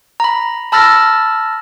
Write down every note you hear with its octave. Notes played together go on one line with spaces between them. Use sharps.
A#5 B5
A5 B5 E6 F6 A6 A#6